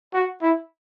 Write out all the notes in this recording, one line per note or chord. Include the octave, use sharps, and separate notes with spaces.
F#4
E4